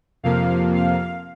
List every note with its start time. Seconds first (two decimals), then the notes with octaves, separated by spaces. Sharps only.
0.23 F2 C3 F3 A#3 F5
0.75 F5